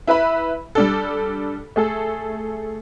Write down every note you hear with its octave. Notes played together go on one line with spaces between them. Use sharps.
E4 B4 E5 B5
G3 D4 A4
A3 G#4 A4